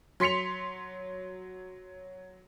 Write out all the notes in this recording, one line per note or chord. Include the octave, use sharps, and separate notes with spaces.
F#3 C6 B6 C#7 F7